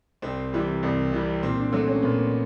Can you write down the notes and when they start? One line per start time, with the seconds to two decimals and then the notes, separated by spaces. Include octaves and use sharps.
0.22 C2 C4
0.53 C3 E3 G3
0.83 C2
1.12 C3 E3 G3
1.43 A#2 C4
1.58 D4
1.72 F#3 A3 C4
1.88 C#4
2.02 A#2 B3